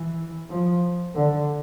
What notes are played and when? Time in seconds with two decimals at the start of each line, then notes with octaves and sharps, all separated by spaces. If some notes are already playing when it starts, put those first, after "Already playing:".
Already playing: E3
0.50 F3
1.15 D3